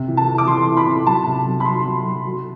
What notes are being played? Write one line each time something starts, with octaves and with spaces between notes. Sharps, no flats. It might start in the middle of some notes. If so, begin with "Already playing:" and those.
Already playing: C3
E3
A5
E3
D6
E3 C6
E3
B5
C3
F#3 A5
C3
F#3
B5
F#3 C6
F#3
F#3
F#3